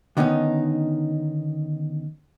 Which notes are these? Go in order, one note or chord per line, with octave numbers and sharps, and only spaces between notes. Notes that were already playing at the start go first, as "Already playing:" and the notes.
D3 D#3 B3 C#4 D#4